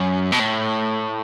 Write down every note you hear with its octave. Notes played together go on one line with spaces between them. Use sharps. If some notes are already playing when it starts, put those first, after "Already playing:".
Already playing: F#2
B2
A2